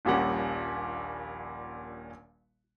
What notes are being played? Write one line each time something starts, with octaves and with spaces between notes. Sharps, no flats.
D#1 A#1 A#2 G3 C#4 F#5